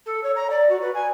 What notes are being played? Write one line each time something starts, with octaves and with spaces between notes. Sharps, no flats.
A4
C#5
A#5
D5
F#4
B4
G#5